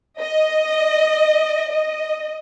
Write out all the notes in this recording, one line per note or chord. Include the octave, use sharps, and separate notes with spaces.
D#5
D#5